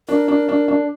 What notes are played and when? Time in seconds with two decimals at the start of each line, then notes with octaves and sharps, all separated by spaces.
0.08 D4 A#4
0.28 D4
0.49 D4
0.68 D4